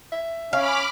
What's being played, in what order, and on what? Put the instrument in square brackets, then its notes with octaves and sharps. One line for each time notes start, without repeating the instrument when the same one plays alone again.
[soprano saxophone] E5
[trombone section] C#4 [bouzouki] F5 [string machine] B5 D6 F6